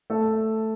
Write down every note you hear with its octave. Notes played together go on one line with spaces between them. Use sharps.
A3 A4